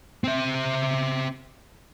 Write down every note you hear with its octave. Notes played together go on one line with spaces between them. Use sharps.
C4 E5